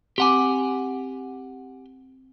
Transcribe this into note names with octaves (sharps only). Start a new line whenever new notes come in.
C4 G4 F#5 G#5 D6